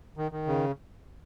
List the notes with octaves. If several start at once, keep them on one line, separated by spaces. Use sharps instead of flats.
D#3
D#3
C#3